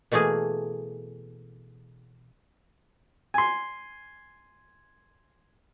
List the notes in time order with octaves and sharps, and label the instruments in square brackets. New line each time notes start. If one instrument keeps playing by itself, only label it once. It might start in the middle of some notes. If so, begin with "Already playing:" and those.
[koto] B2 E3 A3 A#3 G#4
[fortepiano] G#5 C6